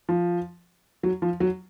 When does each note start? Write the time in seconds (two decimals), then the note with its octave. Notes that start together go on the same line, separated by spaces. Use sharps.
0.09 F3
1.03 F#3
1.22 F3
1.40 F#3